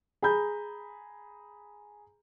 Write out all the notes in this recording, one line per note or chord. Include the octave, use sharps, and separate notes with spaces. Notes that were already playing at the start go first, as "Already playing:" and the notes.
G#4 A#5 B5 G6